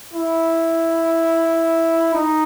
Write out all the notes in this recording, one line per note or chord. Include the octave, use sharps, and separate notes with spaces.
E4
D#4